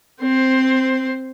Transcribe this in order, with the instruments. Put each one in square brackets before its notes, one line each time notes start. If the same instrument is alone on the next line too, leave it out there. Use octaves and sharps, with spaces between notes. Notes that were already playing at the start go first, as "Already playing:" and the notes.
[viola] C4 C5